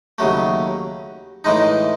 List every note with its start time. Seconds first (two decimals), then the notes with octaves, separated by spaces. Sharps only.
0.18 D#2 C#3 F#3 A3
1.44 A2 E3 G#3 D#4